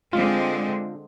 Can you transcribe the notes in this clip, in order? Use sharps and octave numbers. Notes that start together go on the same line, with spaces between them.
D3 G#3 C4 F4